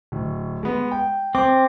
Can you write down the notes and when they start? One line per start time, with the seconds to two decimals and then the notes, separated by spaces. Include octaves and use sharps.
0.12 D1
0.63 G#3 B3
0.91 G5
1.35 C4 D6